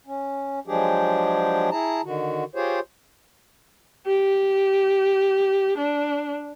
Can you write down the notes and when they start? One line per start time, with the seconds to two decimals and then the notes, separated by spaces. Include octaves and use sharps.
0.07 C#4
0.67 F3 F#3 G#3 D4 G4 G#4
1.71 E4 G#4 A5 A#5
2.05 D3 D#3 F#4
2.55 F4 G4 G#4 C5 C#5
4.07 G4
5.78 D4